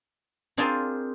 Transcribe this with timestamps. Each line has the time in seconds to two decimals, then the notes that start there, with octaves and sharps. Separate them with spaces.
0.57 C4 D4 F4 G#4 A#4 C5